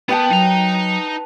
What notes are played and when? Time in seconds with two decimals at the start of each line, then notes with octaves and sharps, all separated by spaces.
0.09 B3 B4 G5 A5
0.31 F#3 D#4 A#5